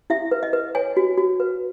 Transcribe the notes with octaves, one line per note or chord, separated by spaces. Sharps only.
E4 E5
B4
D#5
B4
C#5 G#5
F#4
F#4
B4